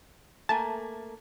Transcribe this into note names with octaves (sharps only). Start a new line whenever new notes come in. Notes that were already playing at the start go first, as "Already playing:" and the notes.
A3 A#3 G#5 A5